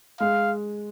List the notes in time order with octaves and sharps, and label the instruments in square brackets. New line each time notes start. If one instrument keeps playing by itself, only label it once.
[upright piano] G#3 [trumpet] F5